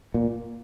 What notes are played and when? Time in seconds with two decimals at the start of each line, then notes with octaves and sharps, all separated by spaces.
0.14 A#2